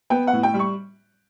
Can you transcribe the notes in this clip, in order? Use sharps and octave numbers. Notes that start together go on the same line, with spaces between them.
B3 G5
F#5
A2
G5
G3
C#6